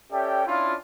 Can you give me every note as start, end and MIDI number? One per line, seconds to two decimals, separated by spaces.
0.12 0.42 61
0.12 0.42 67
0.12 0.42 69
0.12 0.42 74
0.12 0.42 76
0.12 0.42 79
0.47 0.75 61
0.47 0.75 62
0.47 0.75 64
0.47 0.75 65